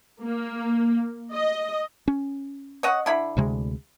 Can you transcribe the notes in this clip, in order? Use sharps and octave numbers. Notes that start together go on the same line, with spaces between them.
A#3
D#5
C#4
C#5 D#5 F#5
D3 E4 B5
D2 C3 G#3